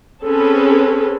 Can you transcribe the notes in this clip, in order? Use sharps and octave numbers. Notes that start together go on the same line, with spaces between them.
C4 C#4 G#4 A4 B4